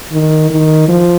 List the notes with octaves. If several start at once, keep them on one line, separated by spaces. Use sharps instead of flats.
D#3
D#3
F3